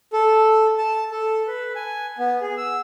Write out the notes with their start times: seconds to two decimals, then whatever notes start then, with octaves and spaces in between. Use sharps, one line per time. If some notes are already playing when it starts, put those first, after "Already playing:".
0.13 A4
0.78 A5
1.11 A4
1.47 B4
1.75 G#5
2.19 B3
2.41 G#4
2.57 E6